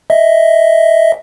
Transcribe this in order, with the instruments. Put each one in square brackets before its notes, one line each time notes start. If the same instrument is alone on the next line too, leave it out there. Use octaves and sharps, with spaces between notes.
[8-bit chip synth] D#5 E5